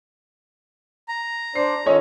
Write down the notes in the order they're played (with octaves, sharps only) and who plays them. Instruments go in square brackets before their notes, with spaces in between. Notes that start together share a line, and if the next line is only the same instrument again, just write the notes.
[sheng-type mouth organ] A#5
[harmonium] D4 C5 D5 [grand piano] C7
[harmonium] D#3 F4 A4 [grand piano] C#4 C#5 D#5